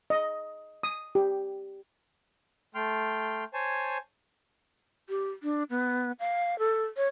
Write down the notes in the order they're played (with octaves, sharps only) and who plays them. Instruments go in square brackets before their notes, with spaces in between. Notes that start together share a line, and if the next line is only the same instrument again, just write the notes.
[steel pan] D#5
D#6
G4
[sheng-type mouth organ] A3 G5 C6 F6
C5 C#5 G#5 A5
[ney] G4
D4
B3
F5
A4
C#5